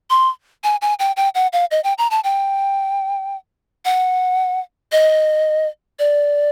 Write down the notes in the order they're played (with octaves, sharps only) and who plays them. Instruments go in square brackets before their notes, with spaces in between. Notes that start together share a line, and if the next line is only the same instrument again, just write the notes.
[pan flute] C6
G#5
G#5
G5
G5
F#5
F5
D#5
G5
A#5
A5
G5
F#5
D#5
D5